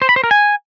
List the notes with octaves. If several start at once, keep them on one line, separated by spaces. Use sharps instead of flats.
C5
B5
C5
A#4
G#5